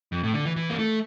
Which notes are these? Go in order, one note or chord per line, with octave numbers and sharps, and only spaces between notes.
F2
A2
D3
E3
E3
A#3
A3